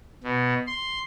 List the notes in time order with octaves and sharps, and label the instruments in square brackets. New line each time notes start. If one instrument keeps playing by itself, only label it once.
[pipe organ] B2
C6